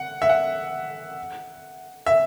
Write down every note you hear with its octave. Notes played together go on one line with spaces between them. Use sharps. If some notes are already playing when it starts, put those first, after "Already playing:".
Already playing: F#5
E5
F#5
E5